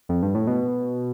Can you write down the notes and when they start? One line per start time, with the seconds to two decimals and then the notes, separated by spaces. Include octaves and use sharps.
0.09 F2
0.23 G2
0.35 A2
0.47 B2